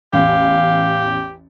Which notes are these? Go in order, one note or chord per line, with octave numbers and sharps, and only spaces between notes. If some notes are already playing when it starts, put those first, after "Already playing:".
A1 E2 G4 F5